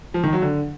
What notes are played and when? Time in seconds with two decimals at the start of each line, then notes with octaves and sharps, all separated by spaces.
0.14 F3
0.24 D#3
0.33 F#3
0.42 D3